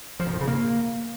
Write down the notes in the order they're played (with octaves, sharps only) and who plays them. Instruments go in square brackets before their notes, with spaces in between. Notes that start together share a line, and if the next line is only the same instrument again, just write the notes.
[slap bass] F3
A#2
A2
C#3
A#3